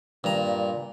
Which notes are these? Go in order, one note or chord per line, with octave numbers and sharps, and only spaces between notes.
G2 A#2 A#5